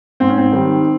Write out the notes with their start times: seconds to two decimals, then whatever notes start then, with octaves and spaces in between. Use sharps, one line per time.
0.20 G#2 C4
0.29 C#4
0.38 C4
0.52 D#3 G3